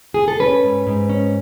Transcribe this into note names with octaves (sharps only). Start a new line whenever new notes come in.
G#4
A4
C#4 B4
G#2
G#2
C#4